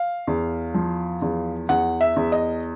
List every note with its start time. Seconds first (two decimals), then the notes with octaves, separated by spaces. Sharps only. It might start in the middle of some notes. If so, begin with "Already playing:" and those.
Already playing: F5
0.27 E2
0.74 F3
1.22 E2
1.69 E2 F#5
2.01 E5
2.16 E2
2.32 D#5